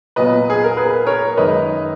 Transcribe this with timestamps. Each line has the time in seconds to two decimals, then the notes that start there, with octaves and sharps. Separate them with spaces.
0.16 A#2 F#3 B3 B4 D#5
0.50 G#4
0.64 A#4
0.77 G#4 B4
1.07 A#4 C#5
1.37 F#2 D#3 G#3 D#4 B4 D#5